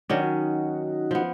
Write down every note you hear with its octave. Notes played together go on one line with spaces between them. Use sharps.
D#3 F#3 C#4 D4 D5 D#5
D#4 F#4
F3 B3